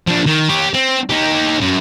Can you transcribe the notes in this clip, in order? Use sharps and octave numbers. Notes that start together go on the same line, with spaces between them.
F3 D4
D#3
G4 C#5
C4
D#4 G4
F#2